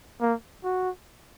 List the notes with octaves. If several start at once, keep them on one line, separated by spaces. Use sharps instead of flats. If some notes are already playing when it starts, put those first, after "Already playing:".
A#3
F#4